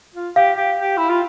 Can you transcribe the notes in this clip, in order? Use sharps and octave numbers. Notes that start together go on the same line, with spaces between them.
F4
G4 F5
G4
G4
E4
F4